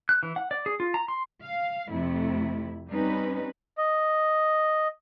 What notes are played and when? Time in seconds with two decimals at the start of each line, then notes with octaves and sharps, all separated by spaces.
0.09 F#6
0.23 E3
0.36 F#5
0.51 D5
0.66 G#4
0.80 F4
0.94 A#5
1.08 C6
1.42 F5
1.89 F2 C3 A3 E4
2.89 G3 C4 C#4 D#4 B4
3.78 D#5